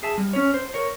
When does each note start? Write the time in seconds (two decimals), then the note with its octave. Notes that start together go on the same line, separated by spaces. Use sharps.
0.03 G#4 E5 A5
0.18 G3
0.33 C#4 C#5
0.54 C5
0.74 A#4 C#5